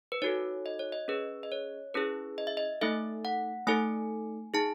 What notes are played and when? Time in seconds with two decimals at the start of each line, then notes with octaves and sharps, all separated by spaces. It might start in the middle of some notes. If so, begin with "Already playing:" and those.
0.12 B4
0.22 D#4 F#4 A4 C#5
0.66 D#5
0.79 C#5
0.92 D#5
1.08 C#4 G#4 B4
1.43 D#5
1.52 C#5
1.94 C#4 E4 G#4 B4
2.38 D#5
2.47 E5
2.57 D#5
2.81 A3 D#4 A4 E5
3.25 F#5
3.67 A3 D#4 A4 G#5
4.54 D#4 G#4 A5